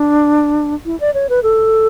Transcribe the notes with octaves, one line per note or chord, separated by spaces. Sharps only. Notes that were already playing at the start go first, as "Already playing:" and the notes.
Already playing: D4
E4
D5
C#5
B4
A4